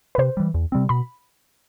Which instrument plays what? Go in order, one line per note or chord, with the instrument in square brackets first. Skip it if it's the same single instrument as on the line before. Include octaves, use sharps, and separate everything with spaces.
[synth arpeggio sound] B4
[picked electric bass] C3 [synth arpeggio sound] C5
[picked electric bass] E3 G3
E2
C3 G3 C4
[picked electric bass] B2 [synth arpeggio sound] B5